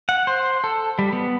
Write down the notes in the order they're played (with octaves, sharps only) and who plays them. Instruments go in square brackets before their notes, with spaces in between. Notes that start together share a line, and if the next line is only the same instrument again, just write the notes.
[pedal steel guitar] F#5
C5
A4
G3
B3